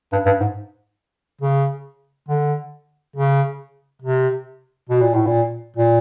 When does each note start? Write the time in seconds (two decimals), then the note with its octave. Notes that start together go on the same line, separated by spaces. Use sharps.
0.12 G2
0.25 G2
0.40 G#2
1.41 C#3
2.28 D3
3.16 C#3
4.02 C3
4.89 B2
5.01 A#2
5.14 A2
5.26 A#2
5.76 A#2